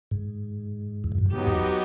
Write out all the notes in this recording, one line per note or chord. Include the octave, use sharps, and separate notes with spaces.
G#2
E2
F2
F#2
G2
G#2 F#3 B3 D#4 G4
E2